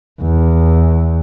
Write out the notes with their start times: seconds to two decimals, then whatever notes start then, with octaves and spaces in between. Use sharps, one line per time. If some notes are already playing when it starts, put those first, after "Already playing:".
0.21 E2